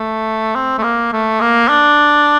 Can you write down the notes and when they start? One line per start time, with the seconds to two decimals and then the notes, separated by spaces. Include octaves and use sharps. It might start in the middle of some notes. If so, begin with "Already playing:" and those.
Already playing: A3
0.56 C4
0.78 A3
0.83 A#3
1.13 A3
1.41 A#3
1.69 D4